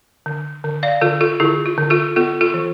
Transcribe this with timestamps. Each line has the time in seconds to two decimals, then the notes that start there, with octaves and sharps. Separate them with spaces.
0.26 D3
0.64 D3
0.83 D5 F5
1.01 D3 F4 A4
1.21 F4 A4
1.40 D3 E4 G#4
1.66 F4
1.78 D3
1.90 F4 A4
2.16 B3 F4 A4
2.41 F4 A4
2.54 E3